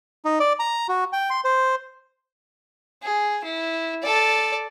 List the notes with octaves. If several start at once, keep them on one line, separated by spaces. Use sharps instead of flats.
D#4
D5
A#5
F#4
G5
C6
C5
G#4
E4
A4 D5